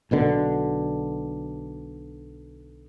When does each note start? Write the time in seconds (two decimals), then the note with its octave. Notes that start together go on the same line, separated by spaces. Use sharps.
0.11 B1 B2 D3